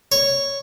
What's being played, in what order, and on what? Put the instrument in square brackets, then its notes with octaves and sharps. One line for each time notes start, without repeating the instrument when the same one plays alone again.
[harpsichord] C#5